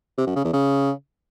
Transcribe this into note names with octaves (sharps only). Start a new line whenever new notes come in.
C3
F#2
C#3
E2
C#3